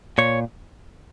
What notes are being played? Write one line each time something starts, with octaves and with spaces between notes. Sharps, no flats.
A#2 C#5